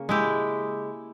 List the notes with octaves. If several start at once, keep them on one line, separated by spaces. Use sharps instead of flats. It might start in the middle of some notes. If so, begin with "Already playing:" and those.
Already playing: C#3 A#3
G#3 E4 G4